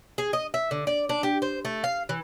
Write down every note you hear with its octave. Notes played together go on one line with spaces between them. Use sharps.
G#4
D#5
E5
D3
D5
D4
G4
C5
A3
F5
E3